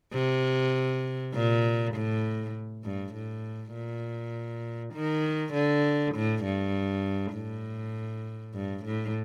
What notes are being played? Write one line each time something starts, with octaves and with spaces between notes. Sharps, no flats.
C3
A#2
A2
G2
A2
A#2
D#3
D3
A2
G2
A2
G2
A2